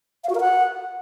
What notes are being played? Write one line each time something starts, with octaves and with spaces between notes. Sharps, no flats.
F5
F#4
A#4
F#5